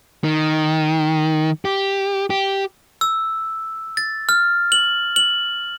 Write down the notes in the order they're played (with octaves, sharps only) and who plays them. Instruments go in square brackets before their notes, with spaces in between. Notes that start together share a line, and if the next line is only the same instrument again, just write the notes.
[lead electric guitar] D#3
G4
G4
[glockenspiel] E6
A6
F6
F#7
F#7